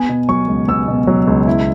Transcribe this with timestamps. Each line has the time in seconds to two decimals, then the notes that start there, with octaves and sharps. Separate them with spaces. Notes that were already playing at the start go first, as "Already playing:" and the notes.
Already playing: B3 G#5
0.09 B2
0.29 F#3 C#6
0.48 C#2
0.68 B3 E6
0.88 B2
1.07 F#3
1.27 C#2
1.47 E4